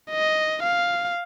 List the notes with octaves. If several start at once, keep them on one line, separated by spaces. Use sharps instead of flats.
D#5
F5